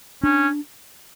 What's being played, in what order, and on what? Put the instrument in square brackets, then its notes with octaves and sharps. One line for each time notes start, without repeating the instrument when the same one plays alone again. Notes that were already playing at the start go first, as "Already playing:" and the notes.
[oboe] C#4 [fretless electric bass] D4